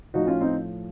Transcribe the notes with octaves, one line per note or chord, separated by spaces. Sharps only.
A2 F3 D#4 F#4
C#4 F4
C4 D#4